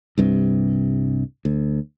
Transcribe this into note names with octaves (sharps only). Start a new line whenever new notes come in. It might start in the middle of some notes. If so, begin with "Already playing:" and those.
C2 G2 C3
D2